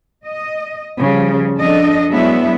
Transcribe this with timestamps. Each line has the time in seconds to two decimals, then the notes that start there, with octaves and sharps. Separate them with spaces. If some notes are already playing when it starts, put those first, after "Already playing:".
0.25 D#5
1.00 C#3 F3 G3
1.58 F2 D4 A4 D#5
2.11 F#3 G#3 B3 D4 E4 E5